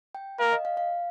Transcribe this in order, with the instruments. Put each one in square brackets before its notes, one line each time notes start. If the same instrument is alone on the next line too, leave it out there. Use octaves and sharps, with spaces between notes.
[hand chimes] G5
[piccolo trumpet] A#4 [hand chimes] F5
[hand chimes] D#5
F5
F5